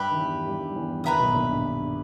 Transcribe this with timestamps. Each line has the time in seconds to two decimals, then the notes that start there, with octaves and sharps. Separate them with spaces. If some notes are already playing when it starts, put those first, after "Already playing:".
Already playing: G2 G3 G4 B4 E5
0.11 D#3
0.18 E2 E3
0.46 G2 G3
0.69 G3
0.75 E2 E3
1.04 D#2 D#3 B4 E5 A#5 D#6
1.19 B1 B2
1.33 A#1 A#2
1.48 G2